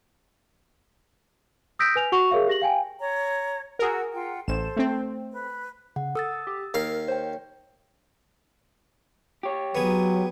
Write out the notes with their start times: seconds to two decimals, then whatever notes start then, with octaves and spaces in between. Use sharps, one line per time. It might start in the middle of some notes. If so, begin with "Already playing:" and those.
1.79 D#6 E6 G6 A#6 B6 D7
1.95 B4 G#5 F7
2.12 F#4 F#5 C#6 F7
2.31 G#4 A#4 C#5 E5 F5
2.47 G4 A#6 F#7
2.62 F5 G5 G#5
3.00 C#5 A#5
3.79 F#4 G#4 A#4 F#5 E6
4.13 F4 F#5 G5
4.48 A1 A4 C5 E7
4.76 A3 C4
5.32 B4
5.96 C#3 F#5
6.15 A4 D#6 E6 A6
6.47 G4
6.74 D#2 A#4 F5
7.08 C5 C#5 G5
9.43 G4 C#5
9.75 F#3 B3 G#4